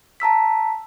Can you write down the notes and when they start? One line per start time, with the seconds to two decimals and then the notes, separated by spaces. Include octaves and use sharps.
0.20 A5 A#5 E6 B6